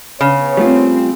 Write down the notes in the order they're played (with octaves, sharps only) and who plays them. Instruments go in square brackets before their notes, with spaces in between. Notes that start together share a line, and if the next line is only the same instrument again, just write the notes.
[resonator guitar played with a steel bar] C#3 [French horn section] B3 C#5
[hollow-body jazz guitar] G3 A3 F4 [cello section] C4